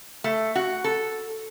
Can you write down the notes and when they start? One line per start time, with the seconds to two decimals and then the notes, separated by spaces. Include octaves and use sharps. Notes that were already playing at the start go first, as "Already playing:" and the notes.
0.24 A3
0.55 F#4
0.84 A4